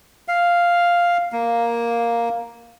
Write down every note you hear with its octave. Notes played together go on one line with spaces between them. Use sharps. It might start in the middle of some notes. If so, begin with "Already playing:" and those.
F5
A#3